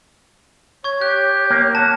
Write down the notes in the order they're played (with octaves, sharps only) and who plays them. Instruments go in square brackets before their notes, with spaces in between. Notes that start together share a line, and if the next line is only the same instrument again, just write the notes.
[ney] C#5 [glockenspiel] C#6 G#6
[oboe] G4 [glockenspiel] F#6
[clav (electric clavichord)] A#3 G5
[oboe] F#5 [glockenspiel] A5